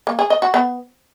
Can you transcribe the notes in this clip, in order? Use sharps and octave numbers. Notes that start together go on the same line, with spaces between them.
A#3
G#4
D#5
F#4
B3